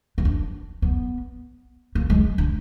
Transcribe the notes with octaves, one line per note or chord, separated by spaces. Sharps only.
B3
D4
B3
A#3
G#3
D4